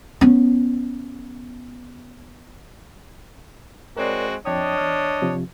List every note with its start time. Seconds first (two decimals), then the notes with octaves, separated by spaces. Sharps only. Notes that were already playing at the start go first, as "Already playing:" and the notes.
0.21 B3 C#4
3.97 G#3 C4 F#4 A#4 C#5 D5
4.45 F2 D4 C#5 D#5 G5 D#6
4.78 E2 F6
5.22 C3 F3